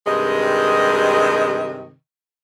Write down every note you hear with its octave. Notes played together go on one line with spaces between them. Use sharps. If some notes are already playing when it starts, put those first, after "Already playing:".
G2 C3 D#3 G#3 D#5